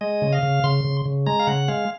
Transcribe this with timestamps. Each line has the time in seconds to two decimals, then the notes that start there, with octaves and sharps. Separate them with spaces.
0.01 G#3 D#5
0.22 C#3
0.33 F5
0.43 C#3
0.64 C#3 C6
0.85 C#3
1.06 C#3
1.27 G#3 A#5
1.40 F5
1.47 C#3 F#5
1.68 G#3 F5